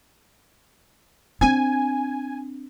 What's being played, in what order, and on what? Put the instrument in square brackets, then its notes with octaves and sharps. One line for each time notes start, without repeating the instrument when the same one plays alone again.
[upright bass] C4 D4 [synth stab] G#5